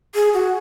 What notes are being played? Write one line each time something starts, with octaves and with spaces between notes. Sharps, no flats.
G#4
F#4